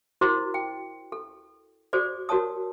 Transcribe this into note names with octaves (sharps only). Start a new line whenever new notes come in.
E4 F#4 A#4 C5 C6 D6
G5
A4
F#4 G#4 A4 C5 D5
F#4 A#4 C#5 A5 D#6